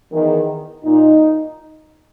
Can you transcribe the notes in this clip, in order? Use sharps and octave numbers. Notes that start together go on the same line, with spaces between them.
E2 D#3
A#2 D#4